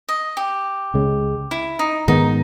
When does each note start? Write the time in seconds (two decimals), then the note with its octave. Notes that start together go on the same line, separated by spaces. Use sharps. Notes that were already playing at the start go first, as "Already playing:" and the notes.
0.09 D#5
0.37 G4
0.94 C#2 C#3 G#3
1.51 E4
1.79 D#4
2.08 G#2 D#3 G#3 B3 D#4